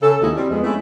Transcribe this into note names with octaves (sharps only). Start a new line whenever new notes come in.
C#3 A4
D#2 C#3 G#3 E4 F#4 D#5
G3 C4
F2 G#3 B3
G#3 A3 C4 C#4 E4